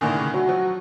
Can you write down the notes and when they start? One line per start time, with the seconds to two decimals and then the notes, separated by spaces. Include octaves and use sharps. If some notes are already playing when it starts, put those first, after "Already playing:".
0.01 A2 D3 D#3 G#5 D6 A#6
0.14 C#3
0.34 F#3 F#4
0.47 F3 F#3